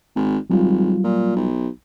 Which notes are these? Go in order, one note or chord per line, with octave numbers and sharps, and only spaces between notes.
G#1
G#1 F#3 G3 F4
A#2
B1